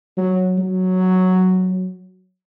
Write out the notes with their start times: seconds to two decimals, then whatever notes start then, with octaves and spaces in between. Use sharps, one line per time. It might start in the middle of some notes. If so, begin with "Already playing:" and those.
0.17 F#3
0.58 F#3